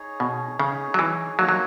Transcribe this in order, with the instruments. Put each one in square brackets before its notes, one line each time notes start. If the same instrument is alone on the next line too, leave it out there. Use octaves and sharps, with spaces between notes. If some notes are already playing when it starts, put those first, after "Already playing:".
Already playing: [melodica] D#4 G#4 C#5
[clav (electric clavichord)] B2
[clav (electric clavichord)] C#3 [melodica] D#4 G#4 C#5
[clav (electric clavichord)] F#3
E3
[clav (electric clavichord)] F#3 [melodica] A#3 D#4 F#4 C#5
[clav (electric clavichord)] F#3